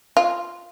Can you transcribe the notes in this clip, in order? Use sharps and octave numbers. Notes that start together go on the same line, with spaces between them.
F4